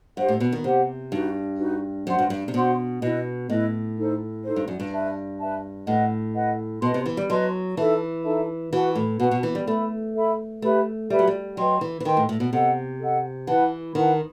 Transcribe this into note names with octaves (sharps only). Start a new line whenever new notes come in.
G2 G4 C5 F#5
A2
B2
D#3
C3 G4 C5 F#5
G2 D#4 F#4 B4
D#4 F#4 B4
F#2 F#4 C5 F#5 C6
G2
G2
C3
B2 F#4 C5 F#5 C6
B2 E4 B4 D#5
A2 E4 B4 D#5
D#4 A4 C5
D#4 A4 C5
G2
F#2
G2
B4 E5 A5
B4 E5 A5
A2 B4 D#5 F#5
B4 D#5 F#5
B2 B4 D#5 A5 C6
C3
E3
G3
F#3 B4 D#5 A5 C6
E3 D#4 A4 E5 A5
D#4 A4 E5 A5
E3 F#4 B4 F#5 A5
A2
B2 F#4 B4 F#5 A5
B2
E3
G3
A3 A4 E5 B5
A4 E5 B5
A3 G4 B4 E5 B5
G3 G4 B4 E5 B5
F#3
G3
F#3 B4 D#5 G5 C6
E3
E3
D#3 B4 D#5 G5 C6
A2
A2
B2
C3 A4 D#5 F#5
A4 D#5 F#5
E3 E4 B4 F#5 A5
D#3 E4 B4 F#5 A5